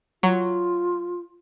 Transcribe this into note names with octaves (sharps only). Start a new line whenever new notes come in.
F#3 F4